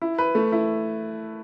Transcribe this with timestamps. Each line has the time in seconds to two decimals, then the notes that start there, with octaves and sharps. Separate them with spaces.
0.02 E4
0.18 B4
0.35 A3
0.52 E4